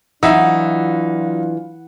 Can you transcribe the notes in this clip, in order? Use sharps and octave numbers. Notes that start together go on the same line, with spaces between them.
E3 F#3 D4 D#4 F4 E5 F#5